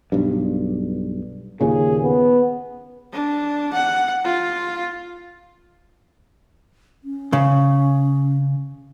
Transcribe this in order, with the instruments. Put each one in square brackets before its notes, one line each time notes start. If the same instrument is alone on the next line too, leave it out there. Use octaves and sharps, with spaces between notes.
[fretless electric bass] B1 G2
[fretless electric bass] D#2 A#2 C#3 [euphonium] G#4
[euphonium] B3
[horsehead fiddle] D4
F#5
F4
[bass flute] C#4
[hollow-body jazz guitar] C#3